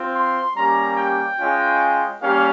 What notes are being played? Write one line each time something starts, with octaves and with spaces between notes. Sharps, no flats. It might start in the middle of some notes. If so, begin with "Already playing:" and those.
Already playing: C4 F4
C6
G3 A#3 C#4 G4 A#5
G5
G#3 C#4 F4
G3 A#3 C#4 G4 F5